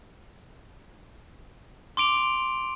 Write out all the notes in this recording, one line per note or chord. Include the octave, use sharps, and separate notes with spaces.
C6 D6 D7 F7